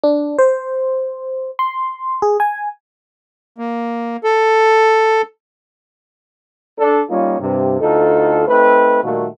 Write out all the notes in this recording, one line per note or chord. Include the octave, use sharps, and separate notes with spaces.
D4
C5
C6
G#4
G#5
A#3
A4
D4 A4
G3 A#3 C#4 D#4 F4
G2 C3
D2 D#4 F4 A4
A3 C4 D#4 B4
A#2 D#3 G3 A3 A#3 F#4